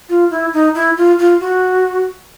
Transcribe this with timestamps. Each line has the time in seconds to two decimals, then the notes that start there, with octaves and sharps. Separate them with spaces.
0.09 F4
0.31 E4
0.53 D#4
0.75 E4
0.97 F4
1.19 F4
1.40 F#4